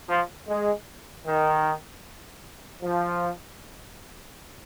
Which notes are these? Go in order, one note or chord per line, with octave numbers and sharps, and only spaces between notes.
F3
G#3
D#3
F3